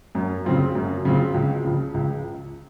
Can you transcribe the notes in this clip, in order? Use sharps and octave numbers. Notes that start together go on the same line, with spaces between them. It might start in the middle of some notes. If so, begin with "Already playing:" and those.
F#2
C#3 F#3 C4 F4
F#2
C#3 F#3 C4 F4
C#2
C#3 F3
C#2